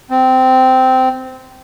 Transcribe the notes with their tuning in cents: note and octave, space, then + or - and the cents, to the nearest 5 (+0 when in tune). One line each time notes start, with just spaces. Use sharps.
C4 -15